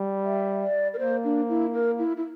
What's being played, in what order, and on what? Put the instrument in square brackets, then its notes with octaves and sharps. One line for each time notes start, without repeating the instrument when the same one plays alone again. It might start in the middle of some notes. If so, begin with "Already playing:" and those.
Already playing: [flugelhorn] G3
[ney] E5
D5
A#4
[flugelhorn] A#3 [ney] C5
[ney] D4
E4
A#4
E4
E4